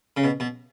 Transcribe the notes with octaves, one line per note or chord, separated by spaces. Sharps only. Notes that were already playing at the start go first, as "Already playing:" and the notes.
C#3
B2
B2